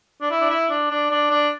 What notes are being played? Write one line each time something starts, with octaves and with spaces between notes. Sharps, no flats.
D4
E4
D4
E4
D4
D4
D4
D4